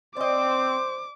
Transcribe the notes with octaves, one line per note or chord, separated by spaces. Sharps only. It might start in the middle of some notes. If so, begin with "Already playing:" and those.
C4 C5 D5 D#5 D6